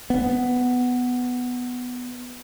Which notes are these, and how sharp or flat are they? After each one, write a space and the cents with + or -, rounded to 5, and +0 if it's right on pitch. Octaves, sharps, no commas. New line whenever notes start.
B3 +5